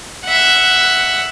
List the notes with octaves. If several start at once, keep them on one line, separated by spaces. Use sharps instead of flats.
E5 F#5